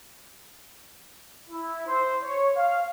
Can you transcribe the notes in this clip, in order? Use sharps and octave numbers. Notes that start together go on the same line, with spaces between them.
E4
C5
C#5
F5